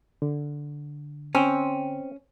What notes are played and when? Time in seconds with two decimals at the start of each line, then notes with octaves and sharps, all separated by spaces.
0.22 D3
1.35 C4 C#4